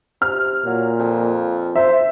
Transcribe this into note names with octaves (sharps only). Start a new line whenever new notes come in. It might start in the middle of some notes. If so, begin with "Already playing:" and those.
C3 F6
A#2 F#3
F2
C5 E5